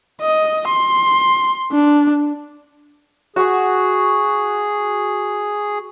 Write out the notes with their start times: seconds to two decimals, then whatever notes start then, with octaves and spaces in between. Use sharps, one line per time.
0.21 D#5
0.68 C6
1.72 D4
3.36 F#4 G#4